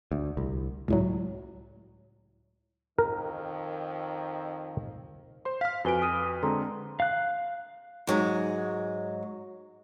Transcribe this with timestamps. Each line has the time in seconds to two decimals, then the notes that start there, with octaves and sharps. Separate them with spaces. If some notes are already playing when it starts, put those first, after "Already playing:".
0.12 D2
0.37 C2
0.88 C#2 A2 F#3
2.98 F2 D#3 A#4
5.45 C5 C6
5.61 F5 F6 B6
5.85 F2 F#4 B4 G#5 D7 G7
6.02 D#6 F6 D#7
6.43 D3 G#3 C4 A4 A#5 C6
7.00 F5 F#6
8.07 G#2 F#3 G#3